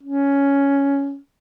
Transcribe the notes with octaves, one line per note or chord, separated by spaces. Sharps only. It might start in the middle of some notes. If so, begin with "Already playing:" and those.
C#4